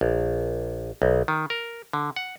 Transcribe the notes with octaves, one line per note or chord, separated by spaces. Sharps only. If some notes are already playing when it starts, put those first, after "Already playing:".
A#1
B1
D#3
A#4
D3
F#5